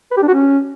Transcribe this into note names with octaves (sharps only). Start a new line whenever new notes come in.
B4
G4
D4
F#4
C#4